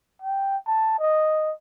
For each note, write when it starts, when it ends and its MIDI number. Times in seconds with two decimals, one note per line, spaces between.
0.22 0.57 79
0.67 0.96 81
1.00 1.53 75